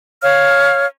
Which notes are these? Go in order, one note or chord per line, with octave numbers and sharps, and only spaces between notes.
C#5 F5 F6